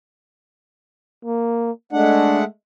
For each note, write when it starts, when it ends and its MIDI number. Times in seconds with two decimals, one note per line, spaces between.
1.25 1.71 58
1.93 2.44 56
1.93 2.44 57
1.93 2.41 62
1.93 2.44 78